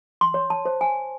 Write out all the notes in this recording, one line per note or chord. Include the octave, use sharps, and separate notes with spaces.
C6
C#5
A5
C5
G#5